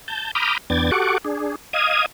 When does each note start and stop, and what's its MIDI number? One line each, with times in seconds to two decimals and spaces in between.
0.08 0.31 81
0.08 0.31 91
0.35 0.58 82
0.35 0.58 83
0.35 0.58 86
0.35 0.58 87
0.35 0.58 89
0.35 0.58 91
0.70 0.91 40
0.70 0.91 59
0.70 0.91 62
0.70 0.91 79
0.70 0.91 92
0.70 0.91 93
0.91 1.18 66
0.91 1.18 67
0.91 1.18 69
0.91 1.18 78
0.91 1.18 85
0.91 1.18 86
1.25 1.56 62
1.25 1.56 68
1.73 2.06 75
1.73 2.06 77
1.73 2.06 87
1.73 2.06 92